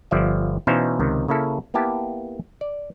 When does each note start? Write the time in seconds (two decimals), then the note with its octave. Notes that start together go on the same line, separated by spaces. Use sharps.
0.11 G1 F3 D5 E5
0.67 B2 E3 C#4 D#4 C5 F5
0.99 C#2 C3 D#3
1.28 C#3 A#3 E4 A4
1.74 A#3 B3 E4 G4 A5
2.61 D5